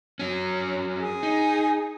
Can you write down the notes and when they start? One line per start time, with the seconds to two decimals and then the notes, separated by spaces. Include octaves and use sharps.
0.19 F#3 C#4
0.98 G#4
1.23 D#4